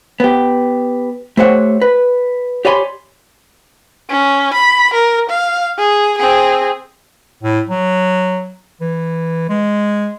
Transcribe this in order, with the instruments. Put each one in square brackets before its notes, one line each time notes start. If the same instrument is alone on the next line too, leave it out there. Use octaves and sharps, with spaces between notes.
[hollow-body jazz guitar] B3 G4
A3 G4 C5 C#5 F5 F#5
B4
G4 C#5 D5 G#5 B5 C6
[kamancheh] C#4
B5
A#4
F5
G#4
C4 G#4
[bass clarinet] A2
F#3
E3
G#3